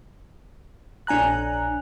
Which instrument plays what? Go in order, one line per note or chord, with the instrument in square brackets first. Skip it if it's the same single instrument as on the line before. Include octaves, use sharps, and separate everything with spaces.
[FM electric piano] A#1 D4 G#5 A#5 F#6